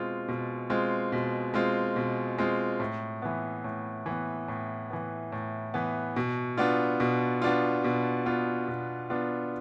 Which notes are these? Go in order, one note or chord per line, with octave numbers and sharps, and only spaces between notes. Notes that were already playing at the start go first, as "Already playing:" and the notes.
Already playing: B2 G#3 C4 F4
B2
G#3 C4 F4
B2
G#3 C4 F4
B2
G#3 C4 F4
A2
E3 B3
A2
E3 B3
A2
E3 B3
A2
E3 B3
B2
B3 D4 F4
B2
B3 D4 F4
B2
B3 D4 F4
B2
B3 D4 F4